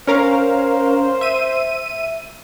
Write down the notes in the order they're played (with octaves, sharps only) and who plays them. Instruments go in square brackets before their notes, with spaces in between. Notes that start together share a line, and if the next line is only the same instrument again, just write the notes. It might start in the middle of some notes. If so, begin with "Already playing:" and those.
[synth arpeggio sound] C#4 A#4 F5 [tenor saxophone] C5
[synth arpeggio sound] E5 D#7